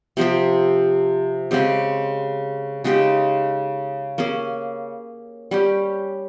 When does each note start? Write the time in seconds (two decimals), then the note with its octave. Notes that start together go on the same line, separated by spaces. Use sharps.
0.17 C3 F3 C4 G4
1.51 C#3 G#3 C4 G4
2.84 C#3 G#3 D#4 G4
4.18 A#3 C#4 G#4
5.51 G3 C#4 G4